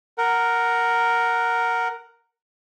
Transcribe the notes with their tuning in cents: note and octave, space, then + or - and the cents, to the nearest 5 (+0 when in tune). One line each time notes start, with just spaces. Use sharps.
A#4 +0 F#5 +0